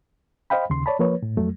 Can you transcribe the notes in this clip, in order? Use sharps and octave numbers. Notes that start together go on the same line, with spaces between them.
C5 D#5 F5 G5 B5
D#2 C#3 C6
C#5 D5 A5 B5
F3 A#3 B4 C#5
A2
F2 F#3 A3